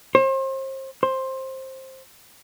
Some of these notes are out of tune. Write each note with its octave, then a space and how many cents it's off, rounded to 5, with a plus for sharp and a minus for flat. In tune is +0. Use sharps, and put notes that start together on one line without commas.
C5 +35
C5 +15